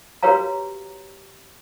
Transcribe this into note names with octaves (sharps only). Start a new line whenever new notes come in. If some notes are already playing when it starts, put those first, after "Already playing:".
F#4 G4 B4 C#5 F5 A#5